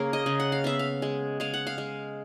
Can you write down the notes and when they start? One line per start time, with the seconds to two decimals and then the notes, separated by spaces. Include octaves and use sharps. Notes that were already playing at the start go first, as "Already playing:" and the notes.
Already playing: C#3 A#3 G#4 A#4
0.13 D#5
0.26 C#3
0.40 F#5
0.52 F5
0.64 B3 E5
0.79 F5
1.02 G#3
1.40 G#3 F5
1.54 F#5
1.67 F5
1.78 G#3